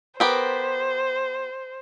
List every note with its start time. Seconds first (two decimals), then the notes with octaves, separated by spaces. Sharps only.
0.20 B3 G4 A#4 C5